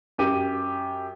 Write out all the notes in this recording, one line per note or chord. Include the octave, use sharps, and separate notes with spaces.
F#2 G4 D#7